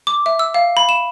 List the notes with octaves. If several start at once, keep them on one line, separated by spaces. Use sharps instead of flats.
D6
E5
E6
F5
B5
E7